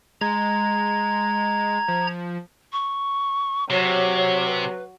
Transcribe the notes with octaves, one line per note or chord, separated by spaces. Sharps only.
G#3 A#5 G#6
F3
C#6
C3 F#3 C#5
B4